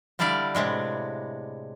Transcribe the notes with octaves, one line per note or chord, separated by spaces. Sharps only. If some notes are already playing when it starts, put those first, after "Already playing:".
D3 G3 D4 E4 D5 F5
A2 C3 G#3 D4